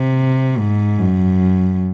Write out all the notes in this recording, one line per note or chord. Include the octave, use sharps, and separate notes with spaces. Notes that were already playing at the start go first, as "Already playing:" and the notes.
Already playing: C3
G#2
F#2